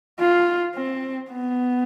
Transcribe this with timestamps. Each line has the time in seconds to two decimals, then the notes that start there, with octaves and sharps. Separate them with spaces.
0.19 F4
0.75 C4
1.31 B3